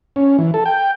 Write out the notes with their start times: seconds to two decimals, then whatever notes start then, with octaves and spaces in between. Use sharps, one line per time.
0.16 C#4
0.38 E3
0.54 A4
0.66 G5